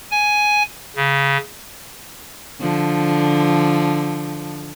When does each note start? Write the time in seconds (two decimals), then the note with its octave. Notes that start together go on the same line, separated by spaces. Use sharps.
0.11 G#5
0.96 C#3
2.60 D3 F3